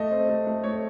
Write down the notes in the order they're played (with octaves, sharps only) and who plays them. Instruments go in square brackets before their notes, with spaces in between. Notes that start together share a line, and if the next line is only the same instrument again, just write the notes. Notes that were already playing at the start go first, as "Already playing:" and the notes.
Already playing: [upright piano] A3 D#5
C4
A3
A3
A3 C#5